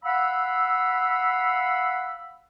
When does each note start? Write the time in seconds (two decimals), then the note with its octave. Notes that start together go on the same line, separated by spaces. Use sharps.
0.04 F5 F#5 B5 E6